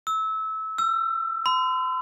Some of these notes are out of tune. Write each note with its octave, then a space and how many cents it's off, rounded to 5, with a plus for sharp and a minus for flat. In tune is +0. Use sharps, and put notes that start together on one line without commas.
E6 -25
E6 +30
C6 -45